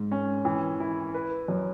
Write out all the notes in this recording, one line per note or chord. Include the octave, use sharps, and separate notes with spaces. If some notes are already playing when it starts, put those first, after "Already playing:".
Already playing: G#2
C#4
E3
E4
B4
F#2